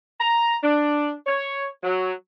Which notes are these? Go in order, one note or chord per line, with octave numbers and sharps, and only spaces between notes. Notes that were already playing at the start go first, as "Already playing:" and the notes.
A#5
D4
C#5
F#3